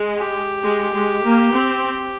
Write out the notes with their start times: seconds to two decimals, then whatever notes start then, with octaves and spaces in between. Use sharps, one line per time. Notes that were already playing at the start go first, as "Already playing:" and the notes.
Already playing: G#3
0.18 G4
0.63 G#3
0.94 G#3
1.24 A#3
1.55 C4